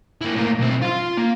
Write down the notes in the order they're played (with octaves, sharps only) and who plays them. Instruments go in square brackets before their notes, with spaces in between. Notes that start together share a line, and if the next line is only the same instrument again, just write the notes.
[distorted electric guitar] A#3 E4
A2 A#3
B1 C4
F4 C6
A#3